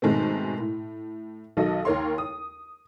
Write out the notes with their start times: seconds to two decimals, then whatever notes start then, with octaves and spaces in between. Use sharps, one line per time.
0.02 G#2 B2 D#3 G#3 A3 C4
0.59 A2
1.57 B1 D#3 F#3 A4 D#5
1.85 D#2 A#4 C#5 C6
2.18 D#6